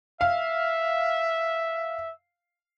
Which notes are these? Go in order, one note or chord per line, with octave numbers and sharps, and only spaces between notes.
E5 F5